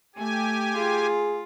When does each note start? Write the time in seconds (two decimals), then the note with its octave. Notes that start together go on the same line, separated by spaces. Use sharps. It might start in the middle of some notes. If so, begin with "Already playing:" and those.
0.16 A3 G4 G#5
0.76 F4 G#4